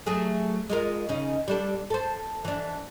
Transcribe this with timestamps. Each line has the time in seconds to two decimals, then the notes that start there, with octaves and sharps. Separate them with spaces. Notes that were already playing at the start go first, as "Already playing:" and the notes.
0.06 F#3 A3 G#4
0.70 G#3 F4 A#4
1.09 C#3 C#4 D#4
1.48 G3 D4 A4
1.90 A4 C5
2.45 E3 D4